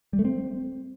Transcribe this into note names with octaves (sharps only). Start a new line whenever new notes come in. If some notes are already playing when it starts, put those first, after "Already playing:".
G3
A3
C4